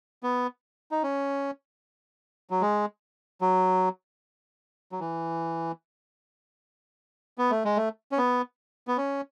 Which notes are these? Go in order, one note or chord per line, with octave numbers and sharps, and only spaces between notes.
B3
D#4
C#4
F#3
G#3
F#3
F#3
E3
B3
A3
G#3
A3
C#4
B3
B3
C#4